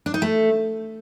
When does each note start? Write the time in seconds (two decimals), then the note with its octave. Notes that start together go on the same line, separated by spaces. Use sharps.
0.06 D4
0.14 D#4
0.22 A3